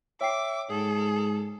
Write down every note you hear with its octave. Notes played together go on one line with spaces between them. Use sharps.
C#5 E5 G5 D6 C7
G#2 G#4 A4